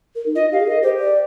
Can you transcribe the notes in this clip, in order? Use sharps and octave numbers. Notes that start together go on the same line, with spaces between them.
A#4
D#4
F4 D#5
G4 F5
G#4
A#4 D#5
G4 C5
D5